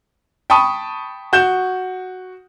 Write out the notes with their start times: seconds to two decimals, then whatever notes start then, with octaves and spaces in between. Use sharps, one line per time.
0.50 G5 A5 B5 C#6 D#6
1.33 F#4 G6 E7